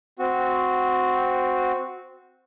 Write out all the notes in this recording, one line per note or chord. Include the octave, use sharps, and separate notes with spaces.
C4 F#4